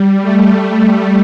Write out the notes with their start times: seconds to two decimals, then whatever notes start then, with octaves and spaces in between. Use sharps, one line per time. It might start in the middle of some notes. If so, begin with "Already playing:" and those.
Already playing: G3
0.22 A3